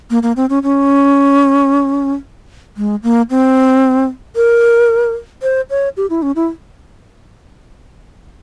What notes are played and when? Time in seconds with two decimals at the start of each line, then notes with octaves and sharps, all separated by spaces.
0.10 A#3
0.23 A#3
0.36 C4
0.50 C#4
0.63 C#4
2.77 G#3
3.03 A#3
3.30 C4
4.36 A#4
5.42 C5
5.70 C#5
5.97 G4
6.10 E4
6.22 C#4
6.36 E4